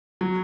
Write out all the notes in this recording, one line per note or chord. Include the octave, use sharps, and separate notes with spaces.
F#3